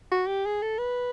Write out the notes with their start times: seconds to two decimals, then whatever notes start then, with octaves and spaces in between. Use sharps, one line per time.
0.12 F#4
0.28 G4
0.46 G#4
0.62 A4
0.79 B4